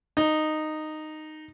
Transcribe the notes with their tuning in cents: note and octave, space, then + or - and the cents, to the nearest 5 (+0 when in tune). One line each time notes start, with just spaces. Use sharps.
D#4 -10